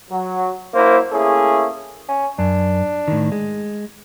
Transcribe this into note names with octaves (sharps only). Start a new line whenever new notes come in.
F#3
F#2 A#3 E4 C5
A3 A#3 C#4 E4 G#4
C#4
F#2 D4
A2 D#3
G#3